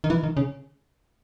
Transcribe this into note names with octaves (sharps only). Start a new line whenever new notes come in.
D#3
E3
D#3
C#3